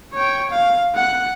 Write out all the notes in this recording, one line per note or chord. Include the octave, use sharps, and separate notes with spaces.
C#5 G5
F5
F#5 F#6